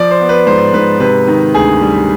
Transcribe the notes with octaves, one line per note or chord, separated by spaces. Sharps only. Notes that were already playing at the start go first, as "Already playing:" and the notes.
Already playing: F3 D5
C5
B3
B4
G#2 C5
G#2 B4
C3 B4
D#3
D2 G#4
G3